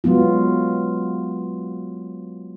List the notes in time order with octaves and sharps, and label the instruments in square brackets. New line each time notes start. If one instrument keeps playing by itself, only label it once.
[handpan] F#3 G#3 B3 F4